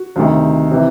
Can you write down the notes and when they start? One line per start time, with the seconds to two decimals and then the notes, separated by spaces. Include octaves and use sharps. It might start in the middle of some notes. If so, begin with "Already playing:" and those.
Already playing: F#4
0.16 D2 C3 D#3
0.71 C3 E3